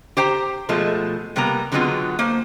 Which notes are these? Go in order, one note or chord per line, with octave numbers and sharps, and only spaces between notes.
G4 C5 G5 A#5
B2 F3 G#3 A3
C3 G3 A#3 B3 A#5
D3 F#3 G#3 B3 C4 F4
A#3 C5